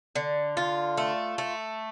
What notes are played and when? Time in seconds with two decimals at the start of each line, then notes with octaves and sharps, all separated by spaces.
0.15 D3
0.57 F4
0.97 A3
1.38 A3